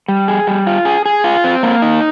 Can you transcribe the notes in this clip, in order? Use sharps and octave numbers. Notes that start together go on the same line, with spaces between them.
G3
G#4
G3
F4
G#4
G#4
F4
C4
A#3
D#4